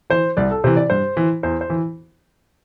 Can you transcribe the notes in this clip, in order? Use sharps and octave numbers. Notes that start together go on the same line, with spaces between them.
E3 C5
C2 D5
A4
C3 E3 C5
D5
G2 C5
E3
E2 C5
C5
E3